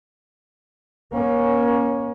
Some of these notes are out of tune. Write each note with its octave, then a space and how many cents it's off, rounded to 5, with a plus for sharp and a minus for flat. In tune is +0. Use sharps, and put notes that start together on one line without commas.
A#3 +30 C#4 +0